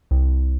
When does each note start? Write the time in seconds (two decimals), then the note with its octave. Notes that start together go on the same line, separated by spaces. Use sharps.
0.11 C2